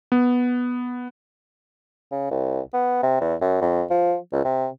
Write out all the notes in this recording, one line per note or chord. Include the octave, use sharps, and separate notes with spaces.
B3
C#3
C2
B3
C3
E2
F#2
F2
F3
C#2
C3